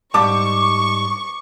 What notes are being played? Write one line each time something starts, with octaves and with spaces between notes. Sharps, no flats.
G#2 G3 A5 C#6 D6